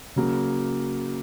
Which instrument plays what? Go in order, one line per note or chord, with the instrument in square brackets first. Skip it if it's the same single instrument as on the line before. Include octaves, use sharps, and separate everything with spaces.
[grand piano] C#3 F#3 A#3